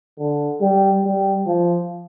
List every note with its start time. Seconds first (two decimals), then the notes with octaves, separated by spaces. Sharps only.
0.19 D3
0.61 G3
1.04 G3
1.46 F3